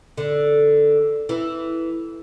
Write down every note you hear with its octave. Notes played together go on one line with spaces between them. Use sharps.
D3
E3